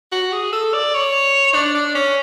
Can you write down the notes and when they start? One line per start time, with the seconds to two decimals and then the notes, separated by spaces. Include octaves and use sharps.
0.12 F#4
0.32 G#4
0.53 A4
0.74 D5
0.94 C#5
1.54 D4
1.75 D4
1.95 C#4